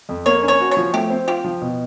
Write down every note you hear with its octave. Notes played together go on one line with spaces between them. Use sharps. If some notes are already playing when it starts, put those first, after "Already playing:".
F2
A#3 C#5
C#4
C#5
F#4
C#5
F3
A3 G4
C4
F4 G4
F3
B2